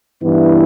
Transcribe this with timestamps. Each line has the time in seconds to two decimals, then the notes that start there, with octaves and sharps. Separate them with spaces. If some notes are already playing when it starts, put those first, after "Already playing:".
0.23 G2 E3 B3 E4